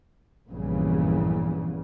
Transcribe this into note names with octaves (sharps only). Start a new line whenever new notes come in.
A#1 E2 G2 C#3 E3